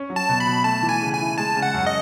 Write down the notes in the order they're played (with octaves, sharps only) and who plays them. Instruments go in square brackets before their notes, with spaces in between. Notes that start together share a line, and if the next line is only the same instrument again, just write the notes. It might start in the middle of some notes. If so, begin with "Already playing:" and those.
Already playing: [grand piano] C#4
F#3
[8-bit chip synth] A5
[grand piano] B2
[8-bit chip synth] B5
[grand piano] B2
[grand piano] A3 [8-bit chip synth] A5
[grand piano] E3
[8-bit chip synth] G#5
[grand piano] C#3
[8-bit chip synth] G#5
[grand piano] E4
[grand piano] G#3 [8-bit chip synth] A5
[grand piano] C#3
[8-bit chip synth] F#5
[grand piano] F#2
[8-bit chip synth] D#5